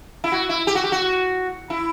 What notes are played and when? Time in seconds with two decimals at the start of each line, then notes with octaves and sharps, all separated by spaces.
0.24 E4
0.32 F#4
0.49 E4
0.67 G4
0.75 F#4
0.84 G4
0.92 F#4
1.70 E4